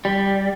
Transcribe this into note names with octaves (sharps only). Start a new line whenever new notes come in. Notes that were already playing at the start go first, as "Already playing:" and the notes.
G3